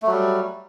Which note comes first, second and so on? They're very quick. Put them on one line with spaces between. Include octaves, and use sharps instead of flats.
A3 F#3 G3